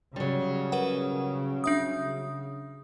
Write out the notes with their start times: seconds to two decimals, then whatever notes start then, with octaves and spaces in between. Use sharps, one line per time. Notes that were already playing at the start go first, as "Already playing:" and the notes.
0.16 C#3 F#3 G3
0.72 A#4 B4 F#5
1.64 D4 E5 D#6